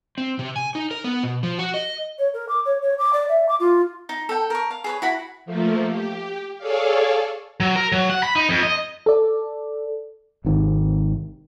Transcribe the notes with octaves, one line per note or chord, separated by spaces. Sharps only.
C4
C3
G#5
D#4
A#4
B3
B2
F3
F#4
D#5
C#5
A#4
D6
C#5
C#5
D6
D5
E5
D6
F4
D#4
A4 G5
A#4 C#6
F5
G#4 B4 C#5
E4 F#4 B5
F3 A3 A#3
G4
G#4 A4 C#5 D5 F5
F#3
A#4
F#3
F#5
B5
D#4
F2
D#5
A4 D5
G#1 C3 D#3